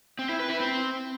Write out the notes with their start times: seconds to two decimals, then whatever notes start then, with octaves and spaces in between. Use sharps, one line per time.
0.19 C4
0.29 E4
0.39 B4
0.50 E4
0.60 C4